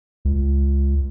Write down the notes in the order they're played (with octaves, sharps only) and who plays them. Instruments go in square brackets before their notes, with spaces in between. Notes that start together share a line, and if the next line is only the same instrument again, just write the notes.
[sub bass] C#2